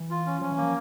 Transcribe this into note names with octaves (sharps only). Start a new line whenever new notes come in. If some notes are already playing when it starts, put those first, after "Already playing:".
Already playing: E3
F4
C#4
F3 C#4
E3
A#3
F3